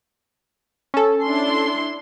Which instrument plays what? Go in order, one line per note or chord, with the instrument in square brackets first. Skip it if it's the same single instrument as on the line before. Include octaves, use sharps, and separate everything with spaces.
[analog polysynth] C#4 A4
[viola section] D4 E4 C6